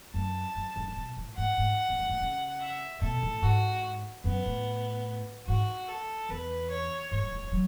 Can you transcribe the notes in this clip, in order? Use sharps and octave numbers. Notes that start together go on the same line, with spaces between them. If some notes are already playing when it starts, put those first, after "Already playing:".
F#2 A5
F#2
F#2
A2
B2
A2
G#2 F#5
G#2
E2
F#2
A2
C#3
E5
B2 A4
A2
G#2 F#4
F#2 B3
A2
G#2 F#4
A4
E2 B4
C#5
G#2 C#5
F#3
G#3
A3
F#3